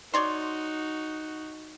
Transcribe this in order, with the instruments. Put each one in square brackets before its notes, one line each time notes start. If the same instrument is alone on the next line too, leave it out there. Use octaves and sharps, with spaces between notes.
[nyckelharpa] D#4 F#4 [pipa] C#5 D5 C6